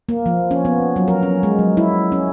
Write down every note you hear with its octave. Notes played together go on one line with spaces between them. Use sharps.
A#3
F3
C#4
B3
F#3
A#4
C#4
G#3
F#3
E4
C#4